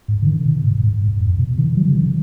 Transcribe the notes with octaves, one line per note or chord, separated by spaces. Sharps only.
G#2
C#3
D#3
B2
G#2
G#2
G#2
F#2
B2
D#3
F#3
C#3
D#3